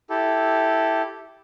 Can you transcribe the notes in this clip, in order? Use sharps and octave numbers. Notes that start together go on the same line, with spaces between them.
E4 G4 A4